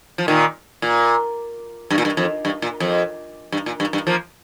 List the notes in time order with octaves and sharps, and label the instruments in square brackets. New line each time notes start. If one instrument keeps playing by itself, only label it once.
[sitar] F3
A#2 D#3
A#2
G2
A#2
G2
F2
G2
A#2
F2
G2
A#2
G2
G2
F3 A#3